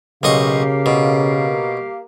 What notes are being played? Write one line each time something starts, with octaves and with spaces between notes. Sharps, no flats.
B1 C#3 A#3 G4 D#5 F5 C#6
B2